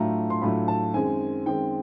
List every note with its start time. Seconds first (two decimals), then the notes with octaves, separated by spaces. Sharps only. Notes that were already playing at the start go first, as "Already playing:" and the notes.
Already playing: A2 F#3 A3 D4 F4 A#5
0.30 C6
0.42 A2 F#3 A3 D4 F4 B5
0.68 A5
0.94 F#2 D#3 G#3 C4 G#5
1.46 F#2 D#3 G#3 C4 G5